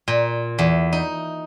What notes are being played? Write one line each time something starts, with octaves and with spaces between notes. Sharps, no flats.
A#2
E2
D#4